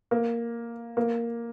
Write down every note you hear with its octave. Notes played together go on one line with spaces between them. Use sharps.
A#3
A#3